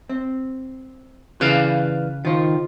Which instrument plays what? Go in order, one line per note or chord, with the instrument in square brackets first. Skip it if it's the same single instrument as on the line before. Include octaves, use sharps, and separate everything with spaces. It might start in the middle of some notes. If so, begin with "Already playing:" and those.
[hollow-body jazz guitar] C4
[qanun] C#3 A5 [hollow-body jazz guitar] E3 [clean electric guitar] B4 D5 F5
[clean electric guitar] D#3 [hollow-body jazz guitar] F4 C5